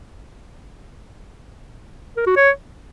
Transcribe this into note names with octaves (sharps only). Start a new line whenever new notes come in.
A#4
F#4
C#5